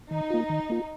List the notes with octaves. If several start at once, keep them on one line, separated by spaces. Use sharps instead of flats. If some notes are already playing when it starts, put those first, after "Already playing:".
D#3 D#4
A#3 F4
D#3
A#3 F4